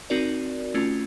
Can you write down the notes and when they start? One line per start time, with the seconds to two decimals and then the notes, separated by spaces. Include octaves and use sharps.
0.10 C4 D#4 F#4 A#4 D5
0.74 A3 C#4 F4